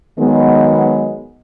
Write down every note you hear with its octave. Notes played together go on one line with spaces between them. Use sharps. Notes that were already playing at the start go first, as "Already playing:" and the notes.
D#3 F#3 G#3 B3